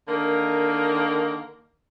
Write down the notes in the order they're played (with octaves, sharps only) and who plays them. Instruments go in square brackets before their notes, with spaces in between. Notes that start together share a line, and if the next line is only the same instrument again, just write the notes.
[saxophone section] D3 D#3 A#3 A#4